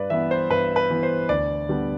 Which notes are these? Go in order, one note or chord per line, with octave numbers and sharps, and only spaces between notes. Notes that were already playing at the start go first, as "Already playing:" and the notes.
Already playing: G2 B4 D5
E3 B3 E5
C5
G2 B4
B4
E3 B3
C5
D2 D5
D3 G3 B3